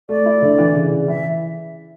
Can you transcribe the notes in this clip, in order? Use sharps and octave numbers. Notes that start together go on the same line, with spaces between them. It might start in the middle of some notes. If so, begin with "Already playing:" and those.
A3 D5
E4
D3
E3
C#3
C#3
E3 E5